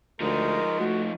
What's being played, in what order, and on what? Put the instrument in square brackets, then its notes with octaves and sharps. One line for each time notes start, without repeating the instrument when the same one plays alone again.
[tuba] D2 [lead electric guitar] F3 D#4 [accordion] G#3 [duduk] A#4
[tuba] A3 [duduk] F#4